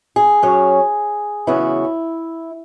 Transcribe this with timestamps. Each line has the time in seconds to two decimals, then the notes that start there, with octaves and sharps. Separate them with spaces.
0.16 G#4
0.43 F#2 F#3 C#4
1.47 E2 C#3 F#3 B3 E4